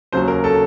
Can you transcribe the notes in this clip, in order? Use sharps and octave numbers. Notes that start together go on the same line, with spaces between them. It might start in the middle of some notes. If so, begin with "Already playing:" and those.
D#2 C#3 F#3 C5
A#4
A4